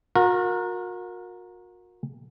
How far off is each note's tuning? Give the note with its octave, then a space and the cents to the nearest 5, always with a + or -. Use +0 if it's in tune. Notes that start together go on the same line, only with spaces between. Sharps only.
F#4 -40 A#4 +0